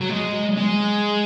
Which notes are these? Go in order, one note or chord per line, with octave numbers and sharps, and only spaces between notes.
F#3
G#3
G#3